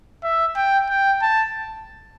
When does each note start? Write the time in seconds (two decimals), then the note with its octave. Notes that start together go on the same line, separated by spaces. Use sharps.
0.23 E5
0.56 G5
0.89 G5
1.22 A5